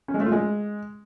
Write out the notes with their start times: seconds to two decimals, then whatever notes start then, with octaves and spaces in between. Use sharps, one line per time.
0.08 C#4
0.14 G#3
0.20 A3
0.26 F4
0.32 G#3